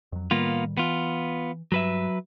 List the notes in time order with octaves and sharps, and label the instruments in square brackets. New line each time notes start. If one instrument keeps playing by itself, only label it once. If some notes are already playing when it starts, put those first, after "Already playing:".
[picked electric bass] F2 F#3
[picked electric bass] A2 D#3 G3 [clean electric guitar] A#3 B3 F4
[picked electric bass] E3 [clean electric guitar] B3 F4
[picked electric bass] G2 [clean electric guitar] F#3 B4 E5